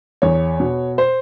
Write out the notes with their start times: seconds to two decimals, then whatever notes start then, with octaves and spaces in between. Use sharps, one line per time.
0.22 E2 C#5
0.60 B2
0.98 C5